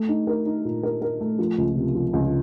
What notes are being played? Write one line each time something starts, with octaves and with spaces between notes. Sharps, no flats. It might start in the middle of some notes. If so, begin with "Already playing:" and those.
Already playing: A3
D#4
A#4
D#4
A#2
A#4
A#4
A3
F3
C#2
C3
F3
C#2